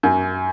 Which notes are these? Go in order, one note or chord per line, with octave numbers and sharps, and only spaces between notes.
F#2